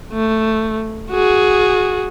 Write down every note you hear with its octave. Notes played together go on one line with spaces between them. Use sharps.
A3
F#4 G#4